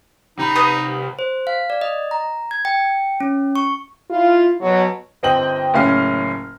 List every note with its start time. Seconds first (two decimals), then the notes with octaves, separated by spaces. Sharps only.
0.39 C3 D#4 B5
0.55 B4 D#6 G6
1.19 C5
1.47 F5
1.70 D5
1.81 D#5
2.11 A#5
2.51 G#6
2.65 G5
3.20 C#4
3.55 C#6
4.11 E4 F4
4.61 B2 F#3
5.23 G1 C4 D#5 G5 F#7
5.74 F#1 A2 C#4 F5 F6